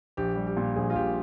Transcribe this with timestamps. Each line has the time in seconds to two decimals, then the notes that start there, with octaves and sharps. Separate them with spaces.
0.17 A#1 G4
0.36 G3
0.47 G4
0.57 A#2
0.76 A#1 G#4
0.90 F4
0.95 A#1 G4